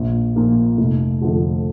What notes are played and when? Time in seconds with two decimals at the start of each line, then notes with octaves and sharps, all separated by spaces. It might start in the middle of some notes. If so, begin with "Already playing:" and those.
Already playing: A#1
0.36 A#2 F3 A#3
0.78 F1
1.21 F2 D3 F3 A3